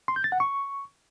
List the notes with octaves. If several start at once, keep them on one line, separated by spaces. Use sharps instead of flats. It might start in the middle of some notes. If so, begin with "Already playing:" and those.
C6
G6
A6
F#5
C#6